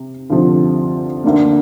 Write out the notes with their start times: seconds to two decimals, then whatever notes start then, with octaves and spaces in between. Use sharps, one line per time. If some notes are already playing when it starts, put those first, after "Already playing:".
Already playing: C3
0.30 D2 C3 F3
1.24 D2 D3 A#3